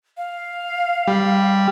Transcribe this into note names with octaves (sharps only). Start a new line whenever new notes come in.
F5
G3